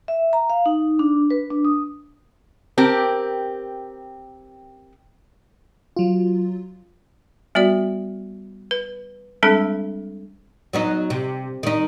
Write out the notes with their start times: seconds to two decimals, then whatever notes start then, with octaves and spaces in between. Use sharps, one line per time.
0.08 E5
0.33 A#5
0.50 F5
0.66 D#4
0.99 D4
1.30 B4
1.50 D4
1.65 D#6
2.78 C4 G4 A#4
5.96 F#3 F4
7.55 G3 B3 F#4 D5
8.71 B4
9.43 G3 G#3 C4 D4 A4
10.73 F#3 B3 D#4
11.10 C3
11.63 D#3 D#4